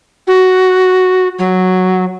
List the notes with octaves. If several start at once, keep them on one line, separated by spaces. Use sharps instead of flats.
F#4
F#3